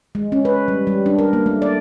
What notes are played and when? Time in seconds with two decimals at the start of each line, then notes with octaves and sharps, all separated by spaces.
0.15 G#3
0.32 C#4
0.45 B4
0.68 G3
0.87 G3
1.06 D4
1.18 A#4
1.33 A#3
1.46 A3
1.62 D5